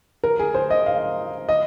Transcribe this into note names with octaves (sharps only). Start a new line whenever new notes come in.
A#4
G#4
C5
D#5
F5
D#5